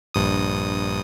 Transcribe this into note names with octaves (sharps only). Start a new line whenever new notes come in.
A#1 G2 D#6